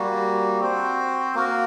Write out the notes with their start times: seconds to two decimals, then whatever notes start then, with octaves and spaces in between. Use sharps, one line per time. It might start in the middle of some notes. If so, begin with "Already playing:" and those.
Already playing: G3 A#3 F#4
0.60 C4 F#4 C5
1.35 A#3 F#4 A#4